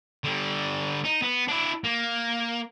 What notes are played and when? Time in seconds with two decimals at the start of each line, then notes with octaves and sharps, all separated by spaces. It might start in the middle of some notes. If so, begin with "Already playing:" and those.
0.24 D3 G3
1.05 D#4
1.22 B3
1.48 D4 E4
1.84 A#3